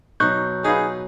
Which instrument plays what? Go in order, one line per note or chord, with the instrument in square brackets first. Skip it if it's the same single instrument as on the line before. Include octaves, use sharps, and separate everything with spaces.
[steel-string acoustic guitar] B2 F#3 [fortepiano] D#4 [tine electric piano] C#6 F#6 G6
[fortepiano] D#4 F4 B4 [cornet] G#4